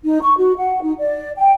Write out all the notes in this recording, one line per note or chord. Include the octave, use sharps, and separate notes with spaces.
D#4
C#6
F#4
F#5
D#4
D5
G5